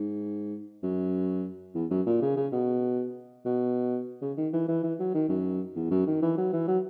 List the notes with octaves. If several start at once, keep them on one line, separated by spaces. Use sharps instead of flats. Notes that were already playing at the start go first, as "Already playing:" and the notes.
Already playing: G#2
F#2
E2
F#2
A#2
C#3
C#3
B2
B2
C#3
D#3
E3
E3
E3
F#3
D#3
F#2
E2
F#2
D#3
E3
F#3
E3
F#3